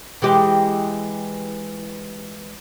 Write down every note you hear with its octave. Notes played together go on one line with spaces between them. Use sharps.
E3 G#3 G4